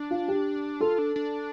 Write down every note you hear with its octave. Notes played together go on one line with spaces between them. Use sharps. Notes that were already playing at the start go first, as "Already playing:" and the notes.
Already playing: D4
F4
G4
F4 A4
D4
D4